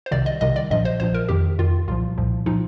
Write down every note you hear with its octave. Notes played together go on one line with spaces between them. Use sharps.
C5
C2 C3 D#3 D5
D#5
C2 C3 D#3 D#5
D5
A#1 A#2 F3 D#5
C5
A#1 A#2 F3 C5
A#4
F2 D#3 G4
F2 D#3 F4
C2 A#2 F3 F4
C2 A#2 F3
A#2 F3 D#4